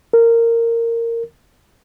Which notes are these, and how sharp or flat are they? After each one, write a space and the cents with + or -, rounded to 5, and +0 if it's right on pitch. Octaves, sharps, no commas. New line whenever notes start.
A#4 -15